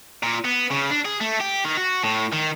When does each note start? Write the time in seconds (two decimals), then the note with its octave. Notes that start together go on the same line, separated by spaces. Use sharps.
0.23 A#2
0.44 B3
0.70 C#3
0.90 D4
1.05 G#4
1.21 A3
1.40 G4
1.64 D#3
1.77 F#4
2.04 A2
2.33 D#3